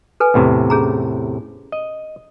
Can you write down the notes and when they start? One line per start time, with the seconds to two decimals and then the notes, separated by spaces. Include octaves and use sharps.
0.20 A4 B4 G#5
0.34 E2 A2 C3
0.70 C#4 G#4 A#5
1.72 D#5